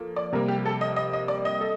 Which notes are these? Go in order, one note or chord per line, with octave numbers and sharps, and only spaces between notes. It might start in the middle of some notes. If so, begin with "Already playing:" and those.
Already playing: F3 A#3 A4
D5
C3 G3 A#3 A#4
G4
A4
D#5
D#5
D#5
D5
D#5
A4